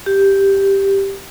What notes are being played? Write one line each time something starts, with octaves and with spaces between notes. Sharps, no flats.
G4